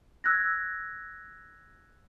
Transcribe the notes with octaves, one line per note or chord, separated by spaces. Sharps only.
E6 F#6 G#6 A#6